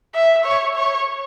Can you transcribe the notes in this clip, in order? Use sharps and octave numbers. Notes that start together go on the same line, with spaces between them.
E5
C#5
C#5